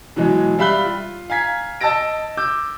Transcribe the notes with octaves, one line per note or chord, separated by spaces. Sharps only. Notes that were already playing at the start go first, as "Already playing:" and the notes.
B2 E3 F#3 G#3
G3 E5 F5 B5 F#6 G7
F4
F5 G#5 A#5 G#6 B6
D#5 A5 E6 A6 A#6 D7
D6 E6 G6